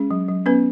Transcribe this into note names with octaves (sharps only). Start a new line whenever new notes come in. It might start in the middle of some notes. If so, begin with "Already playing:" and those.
Already playing: G#3 C#4 G#4
F#3
F#3
B3 C#4 B4